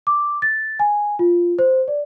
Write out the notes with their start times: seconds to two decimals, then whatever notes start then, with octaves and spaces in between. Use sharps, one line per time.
0.07 D6
0.42 A6
0.80 G#5
1.19 F4
1.59 C5
1.88 D5